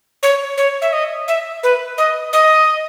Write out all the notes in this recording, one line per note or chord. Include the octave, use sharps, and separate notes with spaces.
C#5
C#5
E5
D#5
E5
B4
D#5
D#5